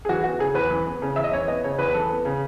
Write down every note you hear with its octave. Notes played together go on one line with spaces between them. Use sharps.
G#4
E3 F#4
B3 F#4
C#3 G#4
E2 B4
E3
B3
C#3
E2 E5
D#5
E3 C#5
B3 D#5
C#3 C#5
E2 B4
B4
E3 A4
B3
C#3